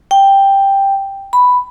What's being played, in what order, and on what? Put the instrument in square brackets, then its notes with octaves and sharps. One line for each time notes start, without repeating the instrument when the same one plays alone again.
[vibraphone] G5
B5